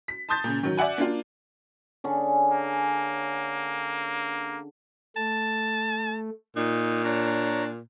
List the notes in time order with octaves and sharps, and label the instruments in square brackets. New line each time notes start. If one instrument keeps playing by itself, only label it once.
[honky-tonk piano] B6
A5 C6 D#6 G6 A6
A#2 C#3
D#3 F#3
D5 E5 F#5 G#5
A#3 D4 F4
[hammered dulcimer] D3 C#4 G#4
[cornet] A#3
[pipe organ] A3 [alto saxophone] A5
[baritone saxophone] A#2 [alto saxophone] D#4
[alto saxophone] D4 [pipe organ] C#5 A#5